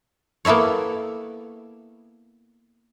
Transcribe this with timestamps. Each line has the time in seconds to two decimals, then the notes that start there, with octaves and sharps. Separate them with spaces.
0.45 A#3 B3 E4 A4 C#5